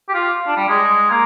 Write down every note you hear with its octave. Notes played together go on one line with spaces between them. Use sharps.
G4
F4
D4
G3
G#3
A#3